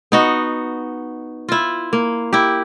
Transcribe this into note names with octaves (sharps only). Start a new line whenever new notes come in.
B3 D#4 F#4
E4 F4
A#3
E4 G4